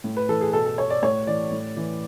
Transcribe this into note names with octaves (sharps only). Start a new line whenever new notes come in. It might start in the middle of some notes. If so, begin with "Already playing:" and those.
A2
B4
E3 A4
G#4
B2 A4
A4
C#5
D5
A2 C#5
E3 D5
A2
E3